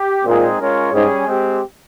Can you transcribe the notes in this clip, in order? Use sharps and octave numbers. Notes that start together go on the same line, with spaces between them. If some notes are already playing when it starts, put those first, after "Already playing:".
Already playing: G4
A#2 G#3 C4 D#4 G#4
G#3 C#4 F4 A#4 C#5
G#2 G3 C#4 G#4
G#3 C4 G4